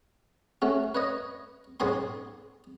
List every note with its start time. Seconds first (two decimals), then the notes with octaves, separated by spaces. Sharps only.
0.62 A3 C#4 F#4
0.95 B4 C#5 D#5
1.80 B1 G#2 G#4 C#5 G#5 C6